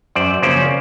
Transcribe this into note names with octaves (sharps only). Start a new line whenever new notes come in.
F#2 C5 D5
C#3 F3 A#3 C#4 C5 D5